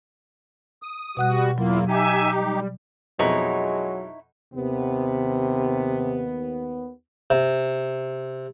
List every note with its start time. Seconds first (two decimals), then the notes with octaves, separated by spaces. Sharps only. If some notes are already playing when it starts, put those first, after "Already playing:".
0.82 D#6
1.17 B2 G3 F#4 F#5 F#6
1.58 E2 F#3 A#3 E4 F4
1.88 D#4 G4 E5 G#5
2.36 G3
3.19 F2 B2 F3 F#3 G#3 D#4 E4 C#5
4.54 D#2 C3 B3
7.30 C3